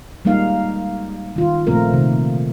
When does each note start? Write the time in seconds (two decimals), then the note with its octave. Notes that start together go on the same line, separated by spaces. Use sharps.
0.25 G3 G#3 A#3 D#4 F5
1.36 D#3 F4
1.67 A#2 F3 A3 A#3 C4 A#4
1.90 C3 D#3